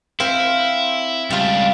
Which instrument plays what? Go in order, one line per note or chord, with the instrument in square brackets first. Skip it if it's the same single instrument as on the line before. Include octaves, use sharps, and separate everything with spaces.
[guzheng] C4 C5 F5 [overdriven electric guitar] E4
[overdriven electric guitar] C#2 D4 [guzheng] G3 F4